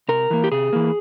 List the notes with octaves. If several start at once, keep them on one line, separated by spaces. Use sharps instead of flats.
C3 A#4
E3 A#3
G4
C3 G#4
E3 A#3